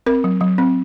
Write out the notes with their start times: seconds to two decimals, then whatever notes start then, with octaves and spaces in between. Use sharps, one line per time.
0.06 C4 A#4
0.24 F#3
0.41 F#3
0.58 C4